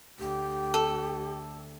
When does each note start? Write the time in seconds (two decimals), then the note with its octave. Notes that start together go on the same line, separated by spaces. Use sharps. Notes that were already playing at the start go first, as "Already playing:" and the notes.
0.19 D2 G4
0.74 A4